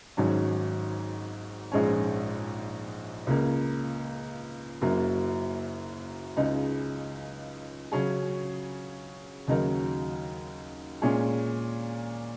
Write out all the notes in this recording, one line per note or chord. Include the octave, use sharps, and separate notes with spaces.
G#1 G#2 F#3 C#4
A#1 G#2 G#3 C#4
C#2 C#3 A#3
F#1 F#2 F#3 A#3
C#2 C#3 G#3 D#4
C#3 F#3 C#4 G#4
D#2 C#3 F#3 D#4 A#4
A#2 G#3 C#4 G#4